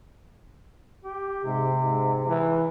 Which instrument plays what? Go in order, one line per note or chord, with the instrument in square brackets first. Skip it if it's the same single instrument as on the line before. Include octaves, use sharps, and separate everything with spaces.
[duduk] G4
[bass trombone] G#2 [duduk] C3
[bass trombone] G#2
E3